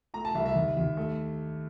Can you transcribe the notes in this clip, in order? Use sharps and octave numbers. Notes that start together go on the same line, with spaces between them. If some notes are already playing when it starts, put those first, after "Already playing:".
A3 A#5
A5
C2 E5
E5
D#2
D#2
A3